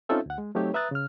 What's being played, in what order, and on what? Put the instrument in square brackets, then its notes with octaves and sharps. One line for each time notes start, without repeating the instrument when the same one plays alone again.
[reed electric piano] C4 C#4 D#4 F4 A4 E5
D2 F#5
G#3
F#3 A3 C4 D#4 G4 C#5
B4 E5 A#5 D#6 F#6 A6
C#3 F6